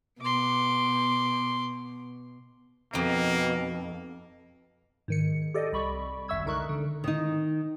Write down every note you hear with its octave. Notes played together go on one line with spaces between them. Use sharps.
B2 C6 D6
F2 B2 A#3 D#4
G#2 D#3 C#7
G4 A4 D5 D#5
C2 D5 B5 C#6
G#1 F#2 E5 C#6 E6 G#6
C#2 D3 D#4 A#4 C#6 F#6
D3
D#3 D#4